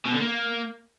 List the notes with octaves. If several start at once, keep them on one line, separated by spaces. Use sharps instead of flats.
B2
D3
A#3